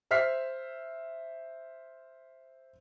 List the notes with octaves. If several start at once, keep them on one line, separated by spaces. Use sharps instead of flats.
C5 E5 F6 B6 C7